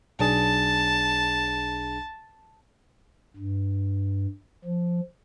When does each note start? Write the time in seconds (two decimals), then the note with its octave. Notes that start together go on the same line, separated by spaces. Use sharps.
0.20 B1 D4 G#4 A5
3.36 G2
4.64 F3